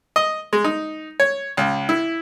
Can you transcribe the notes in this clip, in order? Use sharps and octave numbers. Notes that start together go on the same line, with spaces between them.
D#5
G#3
D#4
C#5
C#2
E4